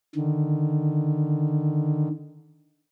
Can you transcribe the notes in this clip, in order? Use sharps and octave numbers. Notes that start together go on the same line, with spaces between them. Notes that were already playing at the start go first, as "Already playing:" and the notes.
D3 D#3